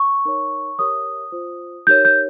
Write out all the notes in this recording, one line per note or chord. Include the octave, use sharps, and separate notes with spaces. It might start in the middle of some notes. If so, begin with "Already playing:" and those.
Already playing: C#6
D#4 A#4 C#5
G4 A#4 C#5 D#6
F4 C5
D#4 G4 A#4 C#5 G6
G6